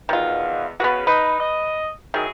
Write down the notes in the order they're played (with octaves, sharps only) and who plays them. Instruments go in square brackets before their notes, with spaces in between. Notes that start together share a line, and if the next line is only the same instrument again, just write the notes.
[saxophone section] E2 B2 [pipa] D#3 F4
[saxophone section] C#3 B4 [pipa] B3 F#4
[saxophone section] D#4 [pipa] B4
[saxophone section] D#5
[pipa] D#3 [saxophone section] F#3 E4 G#4